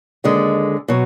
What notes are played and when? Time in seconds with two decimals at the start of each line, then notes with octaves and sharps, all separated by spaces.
0.24 D#2 D3 G#3
0.88 B2 F#3